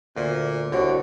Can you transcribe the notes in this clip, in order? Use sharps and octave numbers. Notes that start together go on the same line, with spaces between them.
D2 A#2
C2 A2 D3 F#4